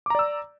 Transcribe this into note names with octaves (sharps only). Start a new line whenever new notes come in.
D5 A#5 D6 E6